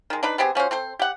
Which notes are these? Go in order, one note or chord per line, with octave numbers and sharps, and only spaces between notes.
D#3 G#3
D4 D#4 B4
B3 C4 G4 G#4
F3 C#4 F#4 C5
C4 A4 C5
G4 F#5